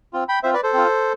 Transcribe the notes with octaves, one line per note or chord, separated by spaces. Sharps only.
C4 F4
G5 B5
C4 F4 C5 E5
B4 D5
A4 C5
C4 F4